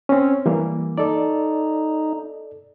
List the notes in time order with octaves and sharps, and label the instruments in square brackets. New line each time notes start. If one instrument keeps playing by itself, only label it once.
[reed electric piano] C4 C#4
E3 G3 A#3
[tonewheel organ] D#4 [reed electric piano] A4 D5